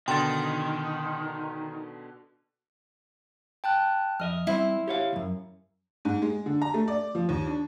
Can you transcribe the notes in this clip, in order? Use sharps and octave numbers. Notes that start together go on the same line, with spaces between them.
B2 D3 D#3 G5 C6 A6
G5 A5 F#6
F2 D#5 E5 F6
G3 C4 E4 C5
G4 C#5 F5
C#2 F#2
G#2
G#3
D3
A#5
A3
D5
F3
D#2
D4